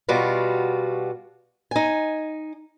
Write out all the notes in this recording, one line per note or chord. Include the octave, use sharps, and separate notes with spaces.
B2 G3 F4 F#4
D#4 G#5